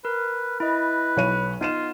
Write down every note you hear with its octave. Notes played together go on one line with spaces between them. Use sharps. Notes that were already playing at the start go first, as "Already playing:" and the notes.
A#4 B4
E4 B4 D#5
B1 C#5 D#7
B3 D#4 F4 D#7 E7